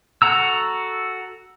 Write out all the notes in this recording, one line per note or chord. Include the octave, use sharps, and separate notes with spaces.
F#4 A4 F#5 A#5 E6